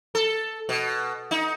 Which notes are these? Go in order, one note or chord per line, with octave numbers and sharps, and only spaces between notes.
A4
B2
D#4